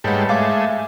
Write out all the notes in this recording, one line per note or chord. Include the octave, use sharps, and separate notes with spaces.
G#2 G3 A3 B4 C#5 D#5 F#5 B5
G#3 A3 E5 F5 D6 G6